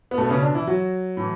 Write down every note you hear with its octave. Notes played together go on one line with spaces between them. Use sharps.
B3
B2 A3
B3
C#3 C#4
D3 D4
E3 E4
F#3 F#4
A2 E3